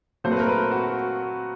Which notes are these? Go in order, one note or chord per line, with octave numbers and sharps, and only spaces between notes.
A#2 F#3 A3 C4 C5
B4
A#4
B4
F#4